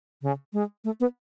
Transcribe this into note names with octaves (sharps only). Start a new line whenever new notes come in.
C#3
G#3
A3
B3